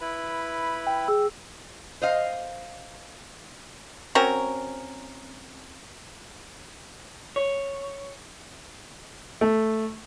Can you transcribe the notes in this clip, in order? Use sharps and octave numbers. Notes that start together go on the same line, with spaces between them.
E4 B4 B5
G5
G#4 E6
C5 D#5 F5
C4 C#4 F#4 A#4
C#5
A3